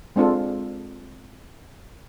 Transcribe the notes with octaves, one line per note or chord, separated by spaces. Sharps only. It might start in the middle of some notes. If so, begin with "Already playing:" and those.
G#3 C4 D4 F4 A4